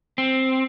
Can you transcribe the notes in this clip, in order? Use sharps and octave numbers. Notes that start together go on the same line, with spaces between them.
C4